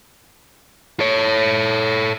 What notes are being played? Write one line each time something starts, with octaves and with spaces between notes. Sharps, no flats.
A4 C#5